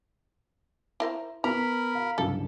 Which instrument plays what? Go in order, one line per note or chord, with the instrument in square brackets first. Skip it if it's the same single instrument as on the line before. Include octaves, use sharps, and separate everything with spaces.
[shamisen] E4 A#4 C5
[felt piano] B3 [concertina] A#4 B5 [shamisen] A#5
[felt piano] F5
[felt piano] F#1 C2 G2 [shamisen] A4